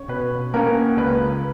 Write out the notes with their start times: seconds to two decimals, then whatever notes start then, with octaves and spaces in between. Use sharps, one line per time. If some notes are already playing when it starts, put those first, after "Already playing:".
Already playing: C#5
0.08 B2 B4
0.54 A#3 C#4 A#4
0.97 C#2 B4